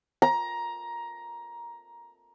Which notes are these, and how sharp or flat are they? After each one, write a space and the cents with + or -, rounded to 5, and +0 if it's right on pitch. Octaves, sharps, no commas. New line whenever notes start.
A#5 +15